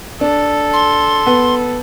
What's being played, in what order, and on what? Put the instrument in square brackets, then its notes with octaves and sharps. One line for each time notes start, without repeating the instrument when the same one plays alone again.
[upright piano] D4 [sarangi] A4
[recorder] C6
[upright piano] B3